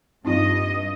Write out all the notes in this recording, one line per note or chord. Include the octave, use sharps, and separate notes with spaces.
G2 C4 D#4 F4 D#5